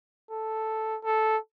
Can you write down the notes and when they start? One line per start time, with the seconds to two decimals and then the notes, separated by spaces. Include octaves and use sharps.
0.31 A4
1.04 A4